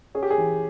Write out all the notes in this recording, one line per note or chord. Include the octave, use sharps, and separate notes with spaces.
C#4 G#4
G4
G#4
E3